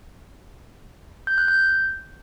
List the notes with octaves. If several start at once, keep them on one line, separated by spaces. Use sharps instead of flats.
G6
F#6
G6